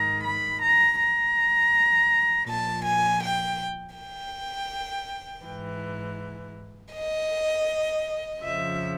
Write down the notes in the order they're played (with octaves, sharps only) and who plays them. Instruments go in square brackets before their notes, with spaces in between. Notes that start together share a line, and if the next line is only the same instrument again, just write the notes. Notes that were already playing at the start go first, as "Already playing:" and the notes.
Already playing: [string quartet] G#2 D#3 A#5
B5
A#5
A#5
A#2 F3 A5
G#5
G5
G5
G#2 E3
D#5
F2 C#3 F3 E5